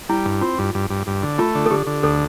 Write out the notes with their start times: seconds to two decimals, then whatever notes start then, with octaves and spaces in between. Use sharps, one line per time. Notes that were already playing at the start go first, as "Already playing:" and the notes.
0.09 G3 E4
0.26 G2
0.41 C4 F4
0.59 G2
0.75 G2
0.90 G2
1.07 G2
1.23 D3
1.38 A3 F4
1.55 D3
1.66 A4
1.71 D3 G4
1.87 D3
2.03 D2 A4